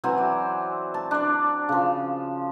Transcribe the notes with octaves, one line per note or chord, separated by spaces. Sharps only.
E3 F#3 C4 G#5
D5
A5
D4 D5
C#3 F3